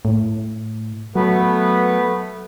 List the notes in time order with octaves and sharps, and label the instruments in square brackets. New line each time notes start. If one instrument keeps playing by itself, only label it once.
[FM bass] A2
[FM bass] F#3 [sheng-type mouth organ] A3 B3 B4